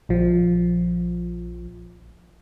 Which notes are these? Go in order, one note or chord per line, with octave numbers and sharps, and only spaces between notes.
A#1 F3